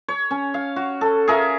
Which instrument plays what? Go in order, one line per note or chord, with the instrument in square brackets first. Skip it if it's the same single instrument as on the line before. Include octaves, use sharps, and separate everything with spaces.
[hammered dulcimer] C#5
C#4
F5
F#4
A4
G#4 A#4 E5 F5